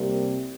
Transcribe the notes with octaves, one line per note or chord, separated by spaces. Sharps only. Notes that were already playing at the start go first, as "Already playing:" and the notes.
Already playing: C2 C3 G3 A#3